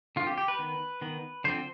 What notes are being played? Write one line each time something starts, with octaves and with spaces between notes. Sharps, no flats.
D3 F3 C4 F4
G4
G4
B4
D#3 B3
D#3 B3
D3 F3 C4 C5